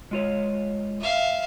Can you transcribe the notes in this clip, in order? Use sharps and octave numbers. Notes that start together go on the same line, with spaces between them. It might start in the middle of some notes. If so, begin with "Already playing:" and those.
G#3 F4 C#5
E5 F5